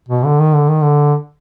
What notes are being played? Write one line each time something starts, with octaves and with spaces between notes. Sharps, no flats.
B2
D3
D#3
D3
D#3
D3